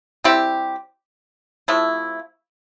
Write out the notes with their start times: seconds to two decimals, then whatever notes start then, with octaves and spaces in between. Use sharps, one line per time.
0.24 G3 C4 E4 G4
1.68 C3 F3 A3 E4